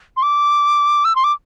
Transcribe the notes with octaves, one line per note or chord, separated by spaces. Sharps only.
C6
D6
E6
C6
D6